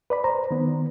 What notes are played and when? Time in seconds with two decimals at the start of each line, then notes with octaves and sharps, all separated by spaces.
0.10 B4 D5 B5
0.24 C5 A#5
0.51 D#3 B3